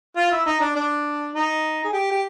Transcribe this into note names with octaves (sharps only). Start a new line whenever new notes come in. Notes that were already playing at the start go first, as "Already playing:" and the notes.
F4
E4
D#4
D4
D4
D#4
G#4
G4
G4